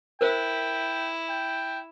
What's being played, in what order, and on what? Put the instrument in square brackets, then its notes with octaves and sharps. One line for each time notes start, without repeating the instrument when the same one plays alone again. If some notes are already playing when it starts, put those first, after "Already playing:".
[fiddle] E4 [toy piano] A#4 C5 [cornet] G5
[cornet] G5